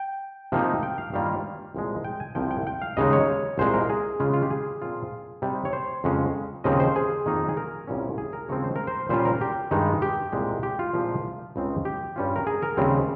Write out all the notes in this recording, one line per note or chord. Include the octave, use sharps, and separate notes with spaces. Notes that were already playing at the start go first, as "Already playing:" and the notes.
Already playing: G5
C3 F3 A#3 D#4
G5
F5
G2 D#3 G3 A#3 F4 F5
C2 A#2 F3 G#3
G5
G#5
C2 C3 F3 G5
G5
G5
F5
D#2 C#3 G#3 D#4 D#5
C#5
C2 A#2 G#3 C5
A#4
G#4
C#3 G#3 C#4 F4
F4
G4
G#4
A#2 F3 C4 F4
C3 G3 C4 D#4
C#5
C5
F2 C#3 G#3 C#4
D#2 C#3 F3 C4 D#5
C5
G#4
F2 D#3 A#3 D#4
G#4
A#4
C2 A#2 G3 C#4
G#4
A#4
D#2 C#3 F3 G#3 C4 C#5
C5
A#4
C5
A#2 G3 C#4 F4 C5
A#4
G4
G2 D#3 G#3 D#4
G4
C2 A#2 G#3
G4
F4
C2 A#2 F3 G#3
C#2 C#3 G#3 C4 D#4
G4
G2 G3 C#4 F4
A#4
G#4
A#4
D#2 C#3 G3 C4